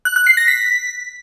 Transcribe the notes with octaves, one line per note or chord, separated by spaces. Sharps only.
F#6
F#6
C7
A#6
B6